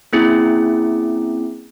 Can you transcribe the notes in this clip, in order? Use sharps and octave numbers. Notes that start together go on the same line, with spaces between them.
A#3 C4 C#4 E4 G#4